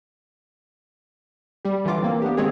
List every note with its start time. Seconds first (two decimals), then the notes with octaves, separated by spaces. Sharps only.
1.65 G3 G4
1.85 D3 E3 F#3 F4 D6
2.03 A#3 C4
2.22 B3 D4 G4
2.37 D#3 G#3 A#3 C4 G#4 C#5